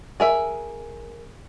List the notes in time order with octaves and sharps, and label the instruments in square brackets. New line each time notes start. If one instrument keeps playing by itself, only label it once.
[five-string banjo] G#4 A#4 E5